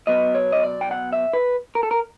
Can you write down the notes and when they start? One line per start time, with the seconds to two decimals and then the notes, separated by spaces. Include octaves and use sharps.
0.07 B2 F#3 B3 D#5
0.35 C#5
0.52 D#5
0.63 D5
0.81 G5
0.91 F#5
1.13 E5
1.33 B4
1.75 A#4
1.83 A4
1.91 A#4